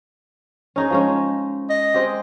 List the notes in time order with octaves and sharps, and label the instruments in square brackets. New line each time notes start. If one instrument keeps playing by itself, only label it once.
[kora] C#4 D#4 G#4
F3 G#3 C#4
[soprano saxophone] D#5
[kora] G#3 C4 G4